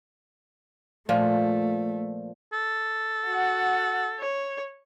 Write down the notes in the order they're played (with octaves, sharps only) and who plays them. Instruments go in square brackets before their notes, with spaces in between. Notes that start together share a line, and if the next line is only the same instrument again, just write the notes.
[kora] A#2 F3 [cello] A3
[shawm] A4
[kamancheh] F#4 F#5
C#5